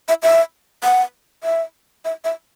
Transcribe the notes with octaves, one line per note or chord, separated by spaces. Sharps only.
E5
E5
F#5
E5
E5
E5